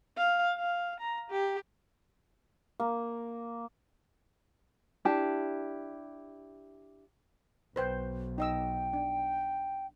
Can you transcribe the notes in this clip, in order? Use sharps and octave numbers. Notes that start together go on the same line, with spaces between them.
F5
F5
A#5
G4
A#3
D4 E4 G4 A5
B1 B4 C5 G5
D#4 D#5 G5 E6
D4